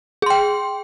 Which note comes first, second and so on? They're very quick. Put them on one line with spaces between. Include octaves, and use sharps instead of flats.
G#4 C6 G5